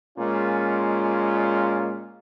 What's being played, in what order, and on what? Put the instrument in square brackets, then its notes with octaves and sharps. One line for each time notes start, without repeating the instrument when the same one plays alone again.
[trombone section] A#2 G#3 C#4 F4